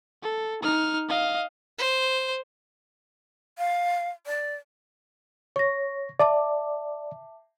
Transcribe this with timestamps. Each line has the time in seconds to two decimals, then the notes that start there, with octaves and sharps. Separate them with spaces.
0.22 A4
0.62 D#4 F6
1.08 D#5 F5
1.78 C5
3.58 F5
4.26 D5
5.56 C#5 C#6 A#6
6.20 D5 E5 A5 D6